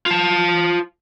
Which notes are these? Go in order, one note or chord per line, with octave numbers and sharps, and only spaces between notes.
F4 A5